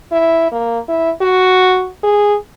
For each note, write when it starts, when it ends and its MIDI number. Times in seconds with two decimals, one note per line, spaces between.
0.12 0.49 64
0.52 0.79 58
0.89 1.10 64
1.21 1.89 66
2.03 2.36 68